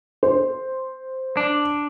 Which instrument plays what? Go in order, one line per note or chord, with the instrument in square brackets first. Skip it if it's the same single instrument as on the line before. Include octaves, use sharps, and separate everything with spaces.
[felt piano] C5
[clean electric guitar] D4